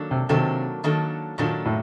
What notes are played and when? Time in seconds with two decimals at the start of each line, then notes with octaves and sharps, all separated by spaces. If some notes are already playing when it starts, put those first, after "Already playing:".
Already playing: D#3 F#3 A#3 D4 A4
0.11 C3
0.29 C3 D#3 F#3 A#3 D4 A4
0.84 D#3 F#3 A#3 D4 A4
1.38 A#2 D#3 F#3 A#3 D4 A4
1.65 A2